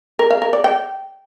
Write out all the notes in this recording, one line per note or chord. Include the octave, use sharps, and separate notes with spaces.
A#4
F5
A#4
D5
G5